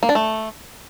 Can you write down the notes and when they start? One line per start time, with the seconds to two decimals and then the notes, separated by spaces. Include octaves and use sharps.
0.03 A#3
0.09 D4
0.15 A3